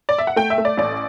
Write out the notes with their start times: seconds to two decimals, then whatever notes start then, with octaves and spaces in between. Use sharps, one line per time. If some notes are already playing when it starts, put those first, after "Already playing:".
0.09 D5
0.18 E5
0.27 F#5
0.36 A3 G5
0.50 E5
0.58 A3
0.65 D5
0.77 A1 D5